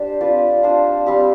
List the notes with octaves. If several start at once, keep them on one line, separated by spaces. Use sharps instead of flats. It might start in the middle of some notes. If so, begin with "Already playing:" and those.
Already playing: D4 G4 C5
C4 F4 B4 D5
D4 F4 C5
G3 C4 G4